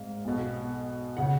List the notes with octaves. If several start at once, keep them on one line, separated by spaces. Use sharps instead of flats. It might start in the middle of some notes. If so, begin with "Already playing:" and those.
Already playing: G#1 G#2 F5
B1 B2
C#3 F#5